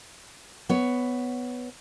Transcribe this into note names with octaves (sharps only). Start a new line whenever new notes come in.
B3 C#5